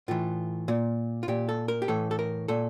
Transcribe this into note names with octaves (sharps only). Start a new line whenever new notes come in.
A2 E3 F4
A#2
F4
A#2 G4
A4
A#4
G4
A2 E3 A4
A4
A#4
A#2 A4